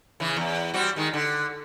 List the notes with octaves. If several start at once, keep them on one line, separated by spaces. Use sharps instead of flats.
C#3 E3
E2
G3 C4 F#4
D#3 G#3
D3